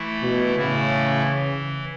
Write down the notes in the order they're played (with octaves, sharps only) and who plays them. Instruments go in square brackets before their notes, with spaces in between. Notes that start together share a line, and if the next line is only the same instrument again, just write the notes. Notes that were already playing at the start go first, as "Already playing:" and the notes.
Already playing: [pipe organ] E3 A3 E4
[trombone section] B2
[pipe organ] A2 E3 A3 E4 [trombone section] C#3
[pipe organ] E3